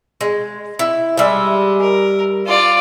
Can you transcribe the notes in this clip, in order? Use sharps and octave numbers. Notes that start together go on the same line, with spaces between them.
G#3
E4
G3 G#3 E5
A#4
F4 D5